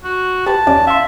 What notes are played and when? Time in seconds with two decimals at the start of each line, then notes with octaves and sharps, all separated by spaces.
0.04 F#4
0.47 G4 B4 A5
0.67 E2 C#4 D5
0.87 E5 F5 C6